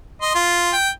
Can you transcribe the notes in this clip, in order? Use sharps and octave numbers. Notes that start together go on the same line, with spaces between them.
D#5 C6
F4
G5